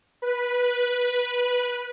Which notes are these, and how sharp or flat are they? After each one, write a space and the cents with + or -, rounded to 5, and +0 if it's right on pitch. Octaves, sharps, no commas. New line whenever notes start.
B4 -10